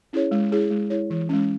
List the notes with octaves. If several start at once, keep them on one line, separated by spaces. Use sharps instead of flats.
C#4 E4 G#4 C#5
G#3
E4 G#4 C#5
G#3
E4 G#4 C#5
E3
G#3 C#4